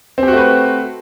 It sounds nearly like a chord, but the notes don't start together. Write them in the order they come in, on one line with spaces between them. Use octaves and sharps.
C4 G4 F#4 A3 B4